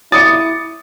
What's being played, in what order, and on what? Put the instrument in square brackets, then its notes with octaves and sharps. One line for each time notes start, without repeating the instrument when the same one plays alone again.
[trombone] E4 [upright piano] D6 C#7 [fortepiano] D#6 [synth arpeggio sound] A6